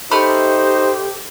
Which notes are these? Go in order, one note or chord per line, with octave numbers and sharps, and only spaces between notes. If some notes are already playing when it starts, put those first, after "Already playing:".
A3 D#4 G4 C5 B5 F6